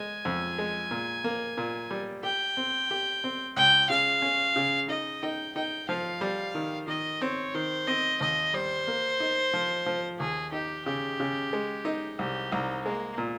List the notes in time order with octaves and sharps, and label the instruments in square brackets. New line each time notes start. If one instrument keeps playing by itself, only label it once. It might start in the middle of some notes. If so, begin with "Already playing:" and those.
Already playing: [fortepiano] G#3 [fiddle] G#5
[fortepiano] F2
G#3
A#2
A#3
A#2
G3
[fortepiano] G4 [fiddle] G5
[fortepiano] C4
G4
C4
[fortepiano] C#2 [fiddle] G5
[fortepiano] C#3 [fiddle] F5
[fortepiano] C#4
C#3
[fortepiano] D#4 [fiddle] D#5
[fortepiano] D#4 [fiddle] G5
[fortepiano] D#4 [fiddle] G5
[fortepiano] F3 [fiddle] F5
[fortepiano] G3
D#3
[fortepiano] D#3 [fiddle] D#5
[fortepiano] C4 [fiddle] C#5
[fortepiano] D#3 [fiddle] C5
[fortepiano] C4 [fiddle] D#5
[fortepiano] D#2 [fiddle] D#5
[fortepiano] G3 [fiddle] C5
[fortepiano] A#3
D#4
F3
F3
[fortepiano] D#2 [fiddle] G#4
[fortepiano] D#4 [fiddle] G4
[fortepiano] C#3 [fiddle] G4
[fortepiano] C#3
G#3
D#4
[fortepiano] C2 [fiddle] G4
[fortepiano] C2 [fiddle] D#4
[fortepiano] G#3 [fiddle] A#3
[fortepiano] A#2